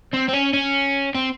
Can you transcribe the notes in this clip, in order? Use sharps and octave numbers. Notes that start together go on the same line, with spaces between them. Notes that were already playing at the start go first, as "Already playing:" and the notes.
C4
C4
C#4
C#4
C4